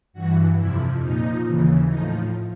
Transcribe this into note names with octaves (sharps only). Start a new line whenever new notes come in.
G2 E3 F#4
F2 C3 F3 E4
A#2 F3 D#4
D#2 C#3 E3
A2 F3 D#4